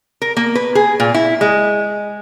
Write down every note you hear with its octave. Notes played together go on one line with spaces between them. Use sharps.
A#4
A#3
B4
G#4
A#2
E4
G#3